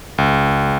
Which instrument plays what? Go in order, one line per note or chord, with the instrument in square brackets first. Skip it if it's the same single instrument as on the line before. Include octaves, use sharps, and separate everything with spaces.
[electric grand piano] C#2